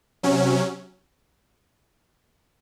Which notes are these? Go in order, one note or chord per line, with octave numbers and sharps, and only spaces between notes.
C3 F#3 C#4